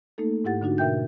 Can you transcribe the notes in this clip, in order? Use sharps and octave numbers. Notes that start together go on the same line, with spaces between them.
A3 A#3 D#4 A4
G#2 E4 G4 F#5 A6
D3 D4 D#4 F#4
B2 A#4 E5 G5 G6